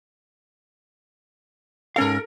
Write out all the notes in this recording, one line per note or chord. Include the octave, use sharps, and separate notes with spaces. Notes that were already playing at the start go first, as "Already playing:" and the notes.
G#2 C#4 A4 A#4 F5